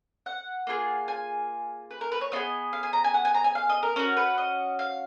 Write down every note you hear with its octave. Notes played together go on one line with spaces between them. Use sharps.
F#5
A#3 F4 G#4
G#5
B4
A#4
B4
C#5
B3 F4 G#4 D#5
F5
G#5
A#5
G#5
F#5
G#5
A#5
G#5
F5
D#5
A#4
C#4 F#4 A#4
B4
D#5
F5